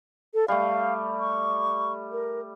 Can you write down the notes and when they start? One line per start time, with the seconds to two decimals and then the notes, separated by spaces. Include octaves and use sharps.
0.34 A4
0.48 G3 A3 F5
1.20 C#6
2.12 A#4